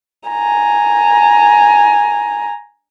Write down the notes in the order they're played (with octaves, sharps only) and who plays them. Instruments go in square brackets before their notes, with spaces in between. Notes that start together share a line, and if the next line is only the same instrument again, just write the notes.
[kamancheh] G#5 A#5